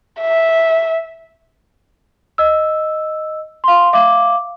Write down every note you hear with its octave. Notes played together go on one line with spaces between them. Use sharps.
E5
D#5 E6
F5 C6
E5 F5 D6